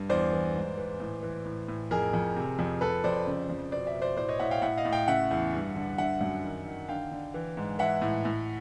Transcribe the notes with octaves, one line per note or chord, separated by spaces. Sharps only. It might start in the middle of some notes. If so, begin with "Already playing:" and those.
Already playing: G2
E2 C5 D5
E3
G#2
E3
A2
E3
A2
A2
F2 G#4 A#4
F2
C3
F2
F2 A4 B4
F2 C5 D5
C#3
F2
B2 C5 D5
D5 E5
B2
C5 D5
A2 C5 D5
C#5 D#5
A2 E5 F#5
F5 G5
A2 E5 F#5
D#5 F5
A2
F5 G5
C#3 E5 F#5
E2
G2
D3
D3 E5 F#5
F#2
D#3
D#3
D3 F5 G5
D3
E3
G#2
E3 E5 F#5
A2
A2